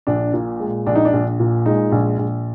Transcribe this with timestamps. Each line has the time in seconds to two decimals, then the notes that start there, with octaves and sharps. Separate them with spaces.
0.07 A#1 D4
0.33 A#2
0.60 G#3
0.87 A#1 D4
0.96 D#4
1.05 D4
1.13 A#1
1.40 A#2
1.66 G#3 D#4
1.92 A#1
2.19 A#1